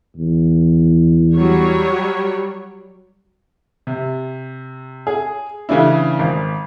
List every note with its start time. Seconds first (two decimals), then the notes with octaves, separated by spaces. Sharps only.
0.17 E2
1.35 F#3 G3 C#5
3.87 C3
5.07 G#4
5.69 C#3 E3 A3 D4 E4
6.19 G#1